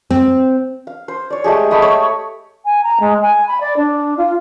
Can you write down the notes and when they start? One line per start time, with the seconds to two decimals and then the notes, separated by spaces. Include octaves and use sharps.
0.10 C4
0.87 F5
1.08 C5
1.30 C#5 D5
1.44 G#3 A3 G4 G#4
1.71 A3 G4 D#5 B5
1.82 C#5
2.65 G#5
2.84 A#5
3.00 G#3
3.22 G#5
3.48 B5
3.61 D5
3.77 D4
4.17 F4